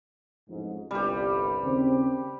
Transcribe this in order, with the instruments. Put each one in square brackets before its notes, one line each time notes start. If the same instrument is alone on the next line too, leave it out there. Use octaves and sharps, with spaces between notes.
[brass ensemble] A1 F2 G#2
[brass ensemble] G1 C2 [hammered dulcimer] G3 G4
[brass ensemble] D#2 C#3 C4